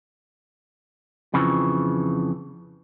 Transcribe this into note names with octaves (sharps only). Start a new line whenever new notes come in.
F2 C#3 E3 F3